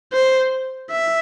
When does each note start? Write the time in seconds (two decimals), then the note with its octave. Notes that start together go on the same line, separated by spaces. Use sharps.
0.13 C5
0.91 E5